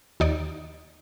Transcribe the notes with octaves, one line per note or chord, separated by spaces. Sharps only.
D#2 D#4 D5